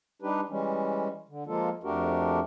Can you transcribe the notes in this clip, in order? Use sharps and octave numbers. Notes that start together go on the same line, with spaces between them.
G3 D4 D#4 G4 B4
E3 G3 G#3 C#4
D3
F3 G#3 A#3 F4 A4
F2 A3 D4 F#4 G4 A#4